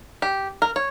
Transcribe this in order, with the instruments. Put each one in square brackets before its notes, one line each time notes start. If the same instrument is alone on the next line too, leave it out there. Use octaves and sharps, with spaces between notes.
[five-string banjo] G4
A#4
C#5